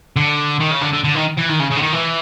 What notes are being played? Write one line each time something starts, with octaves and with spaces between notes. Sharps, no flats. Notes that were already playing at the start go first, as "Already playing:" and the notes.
D3
D#3
C#3
D3
D3
D3
D#3
E3
D#3
C#3
C#3
D3
D#3
E3